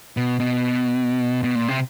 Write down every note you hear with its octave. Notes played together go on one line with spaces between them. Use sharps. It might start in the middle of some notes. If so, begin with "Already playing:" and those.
B2
B2
B2
A#2
C3